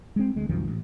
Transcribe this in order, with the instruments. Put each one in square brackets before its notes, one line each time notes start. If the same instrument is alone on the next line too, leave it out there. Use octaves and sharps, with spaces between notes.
[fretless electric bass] G#3 C4
D2 G#3
C2 F#2 D#3 F3
A1